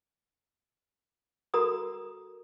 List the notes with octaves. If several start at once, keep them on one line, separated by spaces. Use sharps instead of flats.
F#4 A4 A#4 A#5 D#6